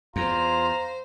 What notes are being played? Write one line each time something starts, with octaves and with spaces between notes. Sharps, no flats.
E2 F4 C5 A#5